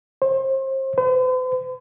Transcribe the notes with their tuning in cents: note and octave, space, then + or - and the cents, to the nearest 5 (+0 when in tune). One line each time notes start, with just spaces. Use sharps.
C5 +35
C5 -45